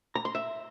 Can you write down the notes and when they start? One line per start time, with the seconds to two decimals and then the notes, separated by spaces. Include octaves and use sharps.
0.15 A#5
0.25 C6
0.35 E5